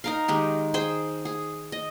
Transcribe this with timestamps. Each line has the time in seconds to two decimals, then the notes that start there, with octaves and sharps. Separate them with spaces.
0.04 D#4 A#4 F5
0.28 D#3 G#3 G4
0.74 G#4 C5 G5
1.25 G#4
1.72 D#5